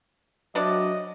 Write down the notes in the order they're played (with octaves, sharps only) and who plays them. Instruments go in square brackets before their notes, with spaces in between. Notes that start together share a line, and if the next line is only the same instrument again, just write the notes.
[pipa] C3 D4 D5 [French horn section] F#3 [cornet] D#5